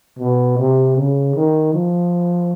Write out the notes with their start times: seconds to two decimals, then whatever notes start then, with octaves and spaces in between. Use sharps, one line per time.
0.19 B2
0.58 C3
0.97 C#3
1.35 D#3
1.73 F3